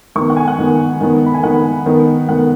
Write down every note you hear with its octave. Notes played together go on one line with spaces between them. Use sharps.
D#3 B3 C#6
F#5
G#5
F#5
D#3 B3
D#3 B3
B5
G#5
D#3 B3 F#5
D#3 B3
D#3 B3 F#5